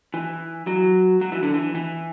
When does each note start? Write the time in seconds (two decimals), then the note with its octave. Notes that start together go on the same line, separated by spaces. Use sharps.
0.14 E3
0.67 F#3
1.21 F#3
1.32 E3
1.43 D3
1.54 E3
1.75 E3